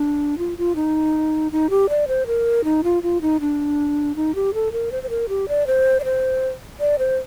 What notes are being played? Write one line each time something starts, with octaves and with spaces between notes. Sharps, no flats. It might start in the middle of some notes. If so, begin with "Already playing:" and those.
Already playing: D4
F4
F4
D#4
D#4
G4
D5
C5
A#4
D#4
F4
F4
D#4
D4
D#4
G4
A4
A#4
C5
C5
A#4
G4
D5
C5
D5
C5
D5
C5